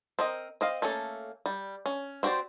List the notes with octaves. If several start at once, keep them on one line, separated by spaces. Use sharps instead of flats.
C4 A#4 D#5
C4 D#5 F5
A3 A#3 C#4 A4
G3
C#4
C4 F#4 G4 C5 D5